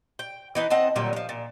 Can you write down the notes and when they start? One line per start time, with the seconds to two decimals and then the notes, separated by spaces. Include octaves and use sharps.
0.19 G5
0.55 E3 D#4 B4
0.70 C4 D#5 F#5 A5
0.96 A#2 D3 F#3 G3
1.13 F3 G#3
1.29 A#2